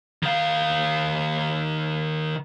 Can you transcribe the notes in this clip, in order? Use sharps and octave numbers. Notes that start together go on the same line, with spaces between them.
D#3 F5